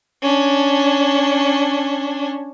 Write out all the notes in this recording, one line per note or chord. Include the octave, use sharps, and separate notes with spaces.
C#4 D4